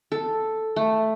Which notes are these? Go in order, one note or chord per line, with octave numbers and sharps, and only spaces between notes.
A4
A3